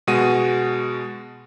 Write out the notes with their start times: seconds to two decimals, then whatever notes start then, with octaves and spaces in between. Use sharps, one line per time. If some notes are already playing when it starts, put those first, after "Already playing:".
0.07 B2 G#3 F#4 D#7